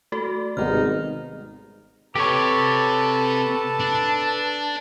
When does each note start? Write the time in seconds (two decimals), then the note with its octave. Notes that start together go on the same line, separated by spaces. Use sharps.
0.12 A3 F#4 A4 D5
0.57 G#1 C3 G3 B3 D#4 F6
2.15 C3 G4 A4 B4 C#5 A5
3.80 D4